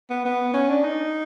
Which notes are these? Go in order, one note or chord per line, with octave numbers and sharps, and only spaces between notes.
B3
B3
C#4
D4
D#4